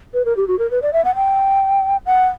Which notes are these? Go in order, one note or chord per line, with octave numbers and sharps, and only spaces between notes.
B4
A#4
G4
F#4
A#4
B4
D5
E5
F#5
G5
F#5